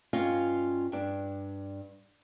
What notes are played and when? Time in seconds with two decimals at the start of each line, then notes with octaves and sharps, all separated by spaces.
0.13 G2 C#4 F4 D#5 F5
0.92 G2 D4